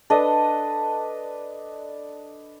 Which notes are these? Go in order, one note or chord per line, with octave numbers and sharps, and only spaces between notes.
D4 A4 B4 D#5